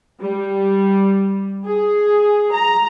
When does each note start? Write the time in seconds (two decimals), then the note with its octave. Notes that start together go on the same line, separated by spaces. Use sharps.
0.20 G3
1.65 G#4
2.52 A#5